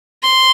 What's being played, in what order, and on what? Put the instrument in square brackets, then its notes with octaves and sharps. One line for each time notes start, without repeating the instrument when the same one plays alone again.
[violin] C6